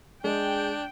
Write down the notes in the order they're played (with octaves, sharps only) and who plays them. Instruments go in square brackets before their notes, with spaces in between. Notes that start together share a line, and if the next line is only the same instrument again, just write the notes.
[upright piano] G#3 [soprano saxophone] D4 [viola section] G5